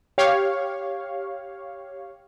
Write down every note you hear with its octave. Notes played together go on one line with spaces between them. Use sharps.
G4 C#5 F5